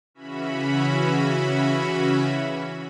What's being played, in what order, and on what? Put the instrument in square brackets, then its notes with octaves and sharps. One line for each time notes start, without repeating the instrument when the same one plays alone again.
[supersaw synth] C#3 E3 C#4 F#4 E5 B5